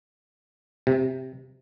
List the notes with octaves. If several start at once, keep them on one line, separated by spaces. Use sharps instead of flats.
C3